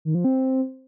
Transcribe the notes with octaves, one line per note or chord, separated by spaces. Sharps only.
D#3
F3
C4